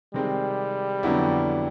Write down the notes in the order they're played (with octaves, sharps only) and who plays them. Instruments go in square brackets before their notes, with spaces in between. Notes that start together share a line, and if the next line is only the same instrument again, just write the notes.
[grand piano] C3 D#3 G#3 C4 [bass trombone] G3
[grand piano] F2 D3 F#3 B3 E4